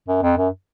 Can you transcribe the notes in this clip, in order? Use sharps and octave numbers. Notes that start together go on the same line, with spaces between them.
F#2
F2
F#2